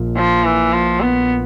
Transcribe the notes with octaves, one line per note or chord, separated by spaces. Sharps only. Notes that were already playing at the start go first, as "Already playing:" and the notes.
Already playing: A#1 A#2
F3
E3
F3
B3